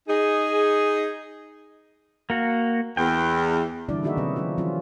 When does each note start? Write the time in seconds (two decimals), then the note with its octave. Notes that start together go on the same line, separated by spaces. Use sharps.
0.09 D#4 G#4
2.30 A#3 F#4
2.97 E2 G5
3.89 D3 E3 G3 D4 E4 D5
4.03 D#3 A#3 D#4 F#4 G#4 E5
4.17 C3 D#3 F#3 C4 C#4 B4
4.36 F3 C#4 D4 F4
4.58 E3 F#3 C#4 F4